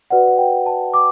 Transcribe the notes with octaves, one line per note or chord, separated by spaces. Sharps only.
F#4 B4 D5 F#5
F#5
G5
A5
D6